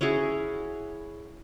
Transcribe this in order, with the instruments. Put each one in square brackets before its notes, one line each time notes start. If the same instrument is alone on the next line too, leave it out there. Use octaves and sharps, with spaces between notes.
[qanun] C#4 E4 F#4 G#4